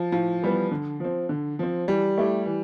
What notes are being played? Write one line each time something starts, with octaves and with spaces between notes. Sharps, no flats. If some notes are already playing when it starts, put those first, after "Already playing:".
Already playing: F3
A2 F3
E3 G3 B3
D3
F3 C4
D3
F3 C4
E3 G3
A3 E4 G4
E3